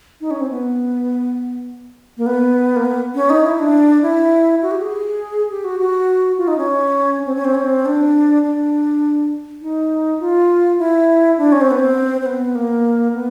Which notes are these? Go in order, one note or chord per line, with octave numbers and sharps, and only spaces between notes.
D#4
C#4
C4
B3
A#3
B3
A#3
B3
C#4
D#4
E4
D4
E4
F#4
G4
G#4
G4
F#4
F#4
F4
D#4
C#4
C4
C#4
C4
C#4
C4
D4
D4
D#4
F4
E4
D4
C#4
C4
B3
C4
C4
B3
A#3
B3